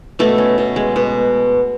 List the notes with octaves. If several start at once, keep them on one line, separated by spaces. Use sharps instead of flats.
B2 A3 A4
C#4
B2
G#3
B2